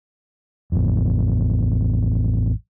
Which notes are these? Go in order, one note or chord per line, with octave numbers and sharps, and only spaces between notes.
A1 F2